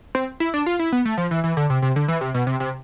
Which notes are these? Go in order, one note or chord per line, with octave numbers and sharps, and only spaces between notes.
C4
E4
D4
F4
E4
B3
A3
F3
E3
E3
D3
C3
C3
D3
E3
C3
B2
C3
C3